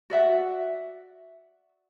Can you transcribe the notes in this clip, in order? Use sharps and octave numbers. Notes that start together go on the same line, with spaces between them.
F#4 D5 E5 F#5